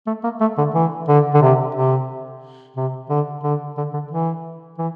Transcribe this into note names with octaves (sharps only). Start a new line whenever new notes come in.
A3
A#3
A3
D3
E3
D3
D3
C3
C3
C3
D3
D3
D3
D3
E3
E3